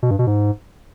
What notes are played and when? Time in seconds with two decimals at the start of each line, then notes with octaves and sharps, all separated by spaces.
0.03 B2
0.11 G2
0.19 B2
0.27 G#2